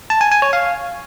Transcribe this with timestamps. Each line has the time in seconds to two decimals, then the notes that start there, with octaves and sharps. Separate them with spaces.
0.10 A5
0.21 G#5
0.32 G#5
0.42 C#5
0.53 F5